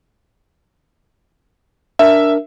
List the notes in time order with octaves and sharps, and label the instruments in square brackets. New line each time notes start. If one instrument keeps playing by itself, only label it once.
[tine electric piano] D4 A#4 [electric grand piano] E5